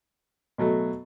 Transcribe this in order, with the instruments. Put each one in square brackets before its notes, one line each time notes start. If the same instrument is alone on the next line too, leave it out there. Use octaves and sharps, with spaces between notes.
[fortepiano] B2 F#3 A3